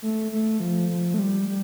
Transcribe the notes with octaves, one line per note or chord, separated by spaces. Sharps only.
A3
A3
F3
F3
A3
G3
G3